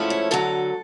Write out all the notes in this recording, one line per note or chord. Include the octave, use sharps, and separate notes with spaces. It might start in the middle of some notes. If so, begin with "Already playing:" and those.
Already playing: G#2 F3 A3 C#4 E4
C#5
D2 D3 F#3 A4